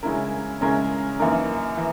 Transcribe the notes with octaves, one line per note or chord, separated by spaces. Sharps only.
C#3 G#3 C#4 E4 A#4
C#3 G#3 C#4 E4 A#4
F#2 E3 A#3 D#4 A#4
E3